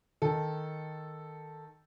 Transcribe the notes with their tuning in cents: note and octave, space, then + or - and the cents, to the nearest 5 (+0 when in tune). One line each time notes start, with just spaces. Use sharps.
D#3 +0 A4 +0